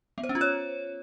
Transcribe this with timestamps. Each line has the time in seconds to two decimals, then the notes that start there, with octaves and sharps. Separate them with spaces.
0.18 B3
0.23 C5
0.29 C#4
0.35 F4
0.41 C#5